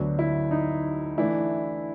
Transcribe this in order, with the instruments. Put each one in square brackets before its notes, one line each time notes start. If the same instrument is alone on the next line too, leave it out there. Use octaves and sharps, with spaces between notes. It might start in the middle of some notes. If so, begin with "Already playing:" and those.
Already playing: [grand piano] D2 D3 F#3 B3 D4
[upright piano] E4
D#4
[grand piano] E3 A3 D4 [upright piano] E4